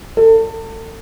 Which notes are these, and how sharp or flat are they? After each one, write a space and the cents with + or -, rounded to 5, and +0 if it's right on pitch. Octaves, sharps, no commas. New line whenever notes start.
A4 +30